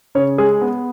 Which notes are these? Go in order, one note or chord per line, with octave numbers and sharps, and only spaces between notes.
C#3 C#5
G#3 G#4
B3